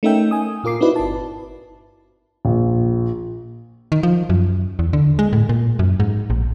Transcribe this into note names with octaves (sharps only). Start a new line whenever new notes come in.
A3 C#4 D#4 A#4 E5 G5
G#5 D#6
A#2 F4 A#4 D6 C7
C4 D#4 E4 F#4 B4 D5
G1 A5
A#1
D#3
F3
F#2
E2
D3
G#3
A2
A#2
F#2
G#2
A#1